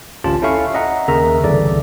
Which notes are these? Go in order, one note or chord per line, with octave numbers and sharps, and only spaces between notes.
A1 D2 C#4 F4 G4 A5
C#4 E4 A4 E5 F5 C#6
D#5 E5 F#5 A#5
D#2 C#3 A#4 E5 A#5
G1 C2 C#3 E3 A4 D5